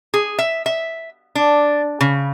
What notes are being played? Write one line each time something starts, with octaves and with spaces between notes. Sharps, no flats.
G#4
E5
E5
D4
C#3